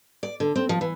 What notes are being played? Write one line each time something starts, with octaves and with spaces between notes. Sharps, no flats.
D5
D3
C4
F3
E3